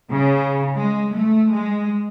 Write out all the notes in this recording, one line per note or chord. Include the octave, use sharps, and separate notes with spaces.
C#3
G#3
A3
G#3